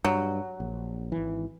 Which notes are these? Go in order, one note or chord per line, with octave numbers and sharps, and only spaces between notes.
G2 F#3
A#1
G#1 E3